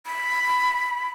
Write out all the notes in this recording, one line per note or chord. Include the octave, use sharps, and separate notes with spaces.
B5